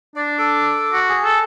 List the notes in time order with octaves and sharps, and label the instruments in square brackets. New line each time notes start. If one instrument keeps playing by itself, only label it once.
[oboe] D4 [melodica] D5
[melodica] A4 D6
[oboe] F#4
[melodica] G#4
[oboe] A4